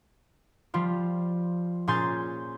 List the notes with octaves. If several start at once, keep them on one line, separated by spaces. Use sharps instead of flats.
F3 G3 F4
A#2 C#4 G#4 C6 G6 A6